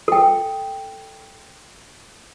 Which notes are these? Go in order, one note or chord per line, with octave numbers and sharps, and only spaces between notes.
A4 G5